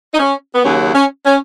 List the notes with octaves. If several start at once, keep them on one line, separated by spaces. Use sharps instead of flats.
D#4
C#4
B3
D#2 C#3 F#3 C#4
C#4
C#4